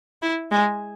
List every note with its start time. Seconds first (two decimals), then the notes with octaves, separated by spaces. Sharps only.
0.22 E4
0.51 G#3